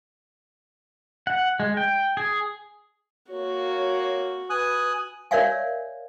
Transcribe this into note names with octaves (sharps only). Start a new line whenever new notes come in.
F#5
G#3
G5
G#4
A#3 F#4 C#5
B4 G#5 D#6 F#6
A#4 C#5 D5 E5 F5 G#5